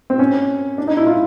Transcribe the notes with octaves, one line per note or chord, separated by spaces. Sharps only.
C4
C#4
D4
D#4
E4
F4